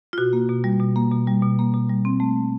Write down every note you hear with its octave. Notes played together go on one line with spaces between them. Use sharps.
F4
B2 F#4
A#3
B2
G3
B2
A#3
B2
G3
B2
A#3
B2
G3
C4
A3